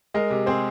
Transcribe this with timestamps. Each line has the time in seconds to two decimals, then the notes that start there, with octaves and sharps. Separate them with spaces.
0.14 G#3 A#4 D#5
0.30 C3
0.46 C4 G#4 C5